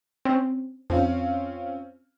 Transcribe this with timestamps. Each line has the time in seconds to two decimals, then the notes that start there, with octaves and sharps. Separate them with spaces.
0.25 C4 C#4
0.90 F2 C4 C#4 F4